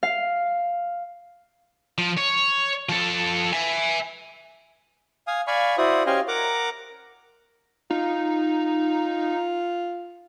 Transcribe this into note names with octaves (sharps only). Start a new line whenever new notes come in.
F5
F3
C#5
F3 A4
E5 G#5
F5 G#5 D#6
D5 F5 G#5 B5 C#6
E4 F#4 C5 D5 D#6
C#4 G4 C5 D#5 F5 G#5
A#4 F#5 A#5 D6
D#4 F4